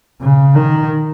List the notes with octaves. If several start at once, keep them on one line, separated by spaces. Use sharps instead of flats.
C#3
D#3